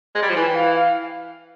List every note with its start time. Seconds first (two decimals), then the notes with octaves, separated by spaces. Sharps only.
0.15 G#3
0.22 G3
0.29 F3
0.36 E3 G#5
0.47 G5
0.55 F5
0.74 F5